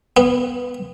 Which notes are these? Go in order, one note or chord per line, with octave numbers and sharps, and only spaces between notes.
B3